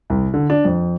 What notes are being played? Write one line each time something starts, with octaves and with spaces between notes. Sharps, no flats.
C2
D3
D4
F2